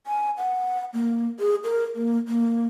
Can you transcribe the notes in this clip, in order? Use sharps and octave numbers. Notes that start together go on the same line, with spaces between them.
G#5
F#5
A#3
G#4
A#4
A#3
A#3